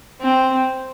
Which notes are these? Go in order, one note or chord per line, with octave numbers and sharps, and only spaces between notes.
C4